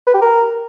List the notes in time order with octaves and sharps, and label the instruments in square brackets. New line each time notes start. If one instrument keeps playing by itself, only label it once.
[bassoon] B4
G4
A#4